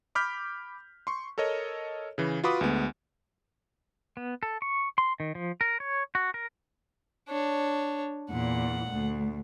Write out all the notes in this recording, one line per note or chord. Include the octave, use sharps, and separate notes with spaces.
B5 D6 F6 G6 B6
C6 C#6
A4 A#4 C#5 D#5
C#3 E3
F4 F#4 B4 B5 D6 D#6
D2 G#3 B3
B3
A4
C#6
C6
D#3
F3
A#4
C#5
F#4
A#4
D4 C#5
E2 A#2 F#5
D2